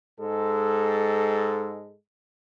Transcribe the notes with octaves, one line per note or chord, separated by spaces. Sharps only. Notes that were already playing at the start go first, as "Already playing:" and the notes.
G#2 G#3 A4